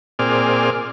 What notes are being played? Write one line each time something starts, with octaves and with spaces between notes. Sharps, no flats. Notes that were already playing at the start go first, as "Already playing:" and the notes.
A#2 C4 G#4 D5 F6